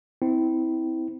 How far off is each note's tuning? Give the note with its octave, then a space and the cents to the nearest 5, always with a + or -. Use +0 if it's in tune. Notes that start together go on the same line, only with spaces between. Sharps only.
C4 -20 E4 -25